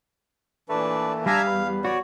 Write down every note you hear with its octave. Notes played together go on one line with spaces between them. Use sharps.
A#2 E3 A3 D4 B4
G3 D4 E5 F5 G#5 A#5
E2 B4
F#4 C#5 D5